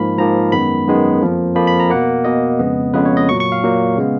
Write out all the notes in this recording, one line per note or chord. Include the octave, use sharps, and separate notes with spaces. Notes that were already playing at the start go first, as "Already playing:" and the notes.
Already playing: G#2 F3 A#3 B5
G#2 F3 A#3 A#5
F#2 D#3 G#3 B3 B5
F#2 D#3 G#3 B3
F2 F3 A#3
F2 F3 A#3 B5
B5
A#5
B2 A#3 F#5
B2 A#3 D#5
F2 C#3 G#3 B3
F2 C#3 G#3 B3 B4
C#5
D#5
A#2 F#3 A#3 C#6
C#6
F5
A#2 F#3 A#3
C#3 G#3 B3